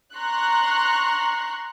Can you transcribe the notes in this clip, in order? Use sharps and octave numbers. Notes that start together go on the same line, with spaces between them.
A#5 C6 C#6 F#6